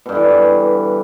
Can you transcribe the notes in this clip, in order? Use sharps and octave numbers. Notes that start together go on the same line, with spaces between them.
G2 B2 D3 E3